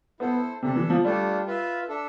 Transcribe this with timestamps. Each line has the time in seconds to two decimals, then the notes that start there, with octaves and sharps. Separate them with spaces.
0.20 B3 E4 A4 C5
0.62 C3 D4 A4 E5 A5
0.76 E3
0.90 F3
1.04 G3 A3 D4 F4 A4
1.46 F4 B4 E5
1.89 D4 A4 E5